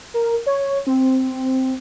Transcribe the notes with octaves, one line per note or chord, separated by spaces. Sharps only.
A#4
C#5
C4